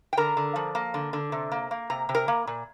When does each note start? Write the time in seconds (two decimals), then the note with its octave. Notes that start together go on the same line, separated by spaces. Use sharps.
0.13 G5
0.17 D3 A#4 A#5
0.37 D3
0.56 F3
0.75 A#3
0.94 D3
1.13 D3
1.32 C3
1.52 A#3
1.71 A#3
1.90 C3 A#5
2.09 C3
2.15 A#4 A#5
2.28 A#3
2.47 A#2